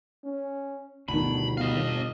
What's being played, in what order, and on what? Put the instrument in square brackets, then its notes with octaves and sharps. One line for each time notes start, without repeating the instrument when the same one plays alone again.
[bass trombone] C#4
[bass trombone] G1 [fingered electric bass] D2 D#3 [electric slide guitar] B2 D4 [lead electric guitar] B5
[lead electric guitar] D#5 F5